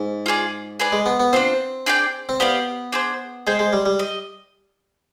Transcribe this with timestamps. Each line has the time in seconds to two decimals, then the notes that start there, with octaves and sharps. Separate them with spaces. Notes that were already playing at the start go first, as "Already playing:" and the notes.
Already playing: G#2
0.26 F4 G#4 D5
0.80 G#4 B4 D5
0.92 G#3
1.06 B3
1.20 B3
1.33 C4 D4 F4 C5
1.86 D4 G#4 D5 G5
2.29 C4
2.40 B3 G4 D5 F5
2.92 D4 G#4 C5
3.47 G#3 G#4 C5 G5
3.59 G#3
3.73 G3
3.86 G3
3.99 D#5